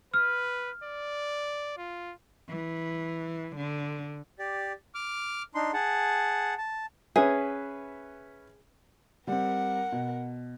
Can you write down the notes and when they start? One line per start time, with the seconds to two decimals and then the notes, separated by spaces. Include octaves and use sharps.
0.14 B4 F6
0.84 D5
1.77 F4
2.49 E3
3.55 D3
4.39 G4 D5
4.95 D6 F6
5.55 D4 D#4 C6
5.73 G#4 F#5 A5
6.58 A5
7.16 C#4 G#4 B4 E5
9.28 G3 C4 A#4 F#5
9.92 B2